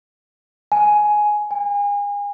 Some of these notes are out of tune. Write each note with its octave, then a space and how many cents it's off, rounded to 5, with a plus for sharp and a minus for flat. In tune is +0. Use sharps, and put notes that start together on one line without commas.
G#5 +10
G#5 -35